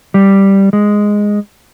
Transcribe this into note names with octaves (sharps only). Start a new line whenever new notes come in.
G3
G#3